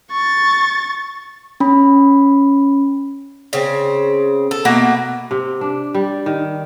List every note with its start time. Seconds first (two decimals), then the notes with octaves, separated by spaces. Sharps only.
0.11 C#6 A6
1.60 C#4 B5
3.53 C#3 C4
4.51 A4
4.65 B2 A3 A#3 F#5
5.31 C3
5.61 D4
5.94 G3
6.26 D#3